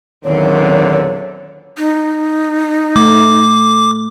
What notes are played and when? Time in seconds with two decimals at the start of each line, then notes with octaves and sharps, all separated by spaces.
0.24 E2 A#2 D3 D#3 F#3 C4 C#4 C#5
1.78 D#4
2.96 A3 D6